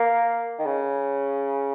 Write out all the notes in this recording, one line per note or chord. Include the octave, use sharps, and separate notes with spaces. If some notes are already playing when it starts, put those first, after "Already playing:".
Already playing: A#3
D#3
C#3